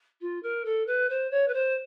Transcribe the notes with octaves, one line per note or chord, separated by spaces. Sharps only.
F4
A#4
A4
B4
C5
C#5
B4
C5